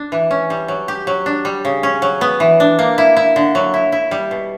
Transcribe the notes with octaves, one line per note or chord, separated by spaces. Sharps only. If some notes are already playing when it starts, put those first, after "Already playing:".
Already playing: D4
E3
C#4
G3
F#3
G4
F#3
D4
G3
C#3
C#4
F#3
B3
E3
D4
A#3
E4
E4
D3
F#3
E4
E4
G3
B2